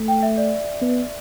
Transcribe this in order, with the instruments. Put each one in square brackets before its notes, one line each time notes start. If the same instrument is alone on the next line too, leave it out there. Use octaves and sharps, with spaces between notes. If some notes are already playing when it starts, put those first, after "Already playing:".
Already playing: [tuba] A3
[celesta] G5
E5
D5
[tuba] B3